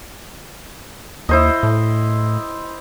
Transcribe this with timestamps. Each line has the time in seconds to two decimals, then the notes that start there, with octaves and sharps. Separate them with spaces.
1.29 D#2 E4 C5 D#5
1.63 A2